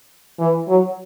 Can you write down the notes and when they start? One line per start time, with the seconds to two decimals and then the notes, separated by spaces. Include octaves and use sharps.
0.40 E3
0.68 F#3